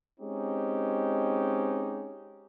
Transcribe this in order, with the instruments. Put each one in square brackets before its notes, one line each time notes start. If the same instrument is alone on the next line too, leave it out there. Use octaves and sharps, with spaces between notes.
[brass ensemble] G#3 C4 C#4 D#4 G4